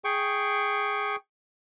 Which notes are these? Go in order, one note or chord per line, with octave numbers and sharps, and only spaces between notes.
G#4 G5 C#6